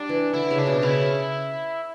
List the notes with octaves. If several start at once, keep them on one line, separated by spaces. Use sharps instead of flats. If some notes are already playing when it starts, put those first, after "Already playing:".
Already playing: G3 D4
E3
D3 E4
C#3
D4
B2
C#3 E4